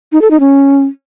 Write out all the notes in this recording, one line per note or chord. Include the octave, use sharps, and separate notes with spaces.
D#4
A4
D#4
C#4